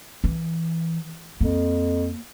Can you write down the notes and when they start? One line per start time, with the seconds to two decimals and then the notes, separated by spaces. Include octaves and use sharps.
0.24 E3
1.41 F2 A#3